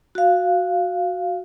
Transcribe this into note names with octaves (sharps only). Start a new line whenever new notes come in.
F#4 F5